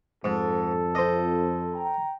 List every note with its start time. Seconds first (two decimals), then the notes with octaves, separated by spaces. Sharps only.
0.24 F2 G#2 A4
0.95 C4 F4 C5 D#5
1.75 G5 A#5